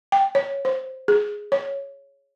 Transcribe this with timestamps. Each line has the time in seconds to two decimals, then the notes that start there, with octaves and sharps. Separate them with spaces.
0.12 G5
0.35 C#5
0.65 C5
1.08 G#4
1.52 C#5